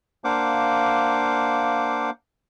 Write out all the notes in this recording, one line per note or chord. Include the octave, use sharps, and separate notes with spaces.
A#3 D4 C5 F5 F#5 D6